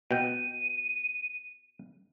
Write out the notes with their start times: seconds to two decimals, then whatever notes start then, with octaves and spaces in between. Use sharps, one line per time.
0.11 B2 G5 D#7